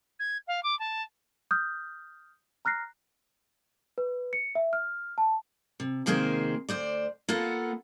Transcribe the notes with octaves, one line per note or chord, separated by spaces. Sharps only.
G#6
F5
D6
A5
D#6 F6 G6
A#5 F6 F#6 A#6 C7
B4
C#7
E5
F6
A5
C3
C3 D#3 G#3 A#3 G#4 C5
D2 C5 D5
A#3 B3 F4 A4 F#5